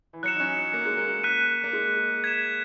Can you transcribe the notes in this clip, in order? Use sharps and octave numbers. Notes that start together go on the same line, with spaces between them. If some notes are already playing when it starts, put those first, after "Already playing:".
E3
F#3 F#6 C#7 E7
D#4
C#4
A#3
G#3
A#3
F#6 B6 D#7
A#3
G#3
G#6 B6 E7